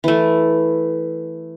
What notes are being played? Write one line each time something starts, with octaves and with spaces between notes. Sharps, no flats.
E3 A3